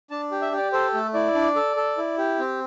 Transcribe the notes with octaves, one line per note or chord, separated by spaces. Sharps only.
D4 A5
G4
E5
G4
D5
A4 C5
A3
E4 D5
D4
A4
A4
E4
G4
C4